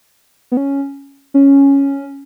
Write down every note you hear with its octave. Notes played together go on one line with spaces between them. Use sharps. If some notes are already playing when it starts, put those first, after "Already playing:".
B3
C#4
C#4